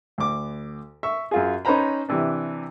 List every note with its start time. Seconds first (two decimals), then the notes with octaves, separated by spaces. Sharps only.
0.18 D2 D6
1.03 E5 C#6
1.31 F#2 F4 G#4
1.65 C#4 D#4 B4 C5 A#5 B5
2.09 C3 E3 D4